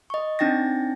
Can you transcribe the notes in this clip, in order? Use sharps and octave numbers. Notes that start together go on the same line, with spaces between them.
D#5 C#6
C4 D4 D#4 G5 A6 A#6